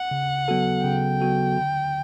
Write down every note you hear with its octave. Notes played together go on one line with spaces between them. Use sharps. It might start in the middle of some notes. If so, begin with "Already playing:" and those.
Already playing: F#5
C#3
F#3 B3 F#4 A4
C#3 G5
F#3 B3 F#4 A4
D3